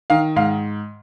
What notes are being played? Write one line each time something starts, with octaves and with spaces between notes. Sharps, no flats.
D#3 F5
G#2 F5